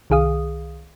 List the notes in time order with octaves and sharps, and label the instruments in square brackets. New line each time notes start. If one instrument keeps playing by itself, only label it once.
[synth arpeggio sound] C2 D#3 G#4 F5 D#6